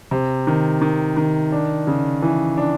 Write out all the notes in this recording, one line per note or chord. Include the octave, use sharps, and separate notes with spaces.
C3
D#3
D#3
D#3
D4
C#3
E3
D4